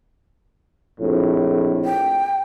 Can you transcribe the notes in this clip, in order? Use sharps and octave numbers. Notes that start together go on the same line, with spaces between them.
A#1 F2 A2
G5